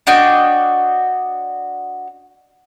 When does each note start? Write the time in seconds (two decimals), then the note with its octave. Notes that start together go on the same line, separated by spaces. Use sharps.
0.07 D4 F#4 D#5 G5